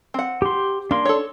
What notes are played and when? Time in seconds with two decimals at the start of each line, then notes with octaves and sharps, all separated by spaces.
0.14 C4 F#5
0.42 G4 C6
0.91 A#3 D4 C6
1.05 A4 C#5